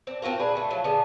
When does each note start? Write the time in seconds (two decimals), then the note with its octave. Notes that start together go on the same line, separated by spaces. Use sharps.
0.07 C4 D4
0.22 C4 F4 F#4 A#4
0.40 D4 G#4 B4
0.55 D3 A3
0.70 F3 F#3 A3 F4
0.84 D3 B3 G#4